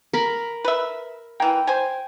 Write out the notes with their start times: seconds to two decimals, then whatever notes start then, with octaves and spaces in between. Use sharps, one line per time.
0.13 A#4 B5
0.65 B4 E5
1.40 E3 A#3 G5
1.67 C5 G#5